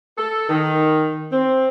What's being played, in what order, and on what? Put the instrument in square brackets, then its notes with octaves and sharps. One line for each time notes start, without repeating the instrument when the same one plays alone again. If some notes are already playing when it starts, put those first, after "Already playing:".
[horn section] A4
D#3
C4